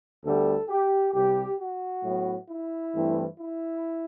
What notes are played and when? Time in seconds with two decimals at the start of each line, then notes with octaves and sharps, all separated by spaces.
0.23 D2 D3 G3 B3 A4
0.68 G4
1.13 C2 C3 G3 G4
1.58 F#4
2.02 A2 F#3 B3
2.48 E4
2.93 G2 E3 A3 C4
3.38 E4